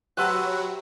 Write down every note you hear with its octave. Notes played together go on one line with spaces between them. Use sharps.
F#3 F#4 G4 B4 C5 E5 F#5 A5